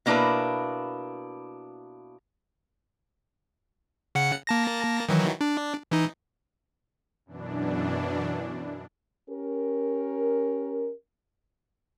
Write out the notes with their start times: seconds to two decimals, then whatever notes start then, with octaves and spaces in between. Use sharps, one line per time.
0.06 B2 A#3 D4 E4 A#4 B4
4.15 C#3 F#5 C#7
4.47 A#3 A5 A#6
5.09 D#3 E3 F#3
5.41 D4
5.91 E3 D#4
7.26 F#2 B2 E3 D4
9.30 C#4 G4 A#4